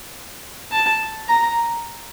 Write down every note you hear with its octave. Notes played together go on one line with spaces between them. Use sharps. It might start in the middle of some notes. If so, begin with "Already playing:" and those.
A5
A#5